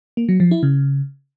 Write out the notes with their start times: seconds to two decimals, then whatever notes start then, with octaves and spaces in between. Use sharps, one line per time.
0.17 A#3
0.29 F#3
0.40 F3
0.51 E4
0.63 C#3